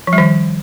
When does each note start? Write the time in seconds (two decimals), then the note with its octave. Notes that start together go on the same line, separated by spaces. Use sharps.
0.07 F3
0.13 G3
0.18 D#3